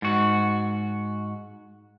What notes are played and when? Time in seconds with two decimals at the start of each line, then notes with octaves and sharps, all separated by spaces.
0.02 G#2 F#4